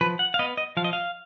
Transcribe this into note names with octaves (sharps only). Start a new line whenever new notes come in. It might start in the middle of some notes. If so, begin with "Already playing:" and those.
F3 B4
F#5
F5
B3 D#5
D#5
F3 F5
D#5
F5